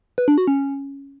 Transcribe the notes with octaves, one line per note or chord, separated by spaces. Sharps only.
B4
D4
F#4
C#4